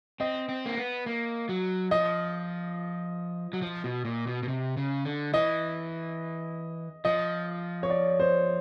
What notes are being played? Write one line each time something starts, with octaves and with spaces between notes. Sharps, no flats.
C4 D#5
C4
A#3
B3
A#3
F#3
F3 D#5
F#3
F3
B2
A#2
B2
B2
C3
C#3
D3
E3 D#5
F3 D#5
C#5
D5
C5